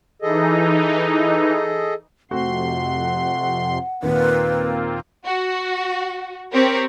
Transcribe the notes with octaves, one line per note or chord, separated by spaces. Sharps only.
E3 D#4 G#4 A4 D#5
F2 C3 A3 C4 F#4 F#5 C6
D#2 A#2 A#3 C4 F4 B4
F#4
C4 G4 A#4 C#5